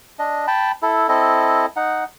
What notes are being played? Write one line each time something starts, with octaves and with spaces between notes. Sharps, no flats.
D4 D#5
G5 A5 B5
E4 A4
C4 E4 A4 D#5
D#4 F#5